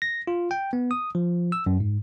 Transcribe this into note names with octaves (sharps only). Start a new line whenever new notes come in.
A#6
F4
G5
B3
D#6
F3
E6
F#2
G#2